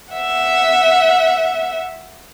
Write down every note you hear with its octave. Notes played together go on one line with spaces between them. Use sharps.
E5 F#5